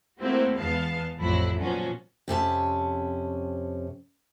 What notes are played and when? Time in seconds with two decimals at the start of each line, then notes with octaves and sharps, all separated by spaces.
0.21 A3 A#3 C4 E4 F#4 G4
0.57 E2 G#3 B3 F5 A5
1.19 A1 F2 F#3 E4
1.61 A#2 F3 F#3 B3 C#4 F#4
2.28 F2 C3 C#4 A5